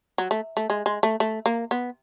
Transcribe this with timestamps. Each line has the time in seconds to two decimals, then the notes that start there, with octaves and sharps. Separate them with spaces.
0.18 F#3
0.31 A3
0.57 A3
0.70 G#3
0.86 G#3
1.03 A3
1.20 A3
1.46 A#3
1.71 B3